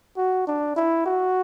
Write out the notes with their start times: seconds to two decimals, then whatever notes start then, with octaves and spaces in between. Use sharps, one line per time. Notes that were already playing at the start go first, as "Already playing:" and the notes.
0.17 F#4
0.47 D4
0.76 E4
1.06 F#4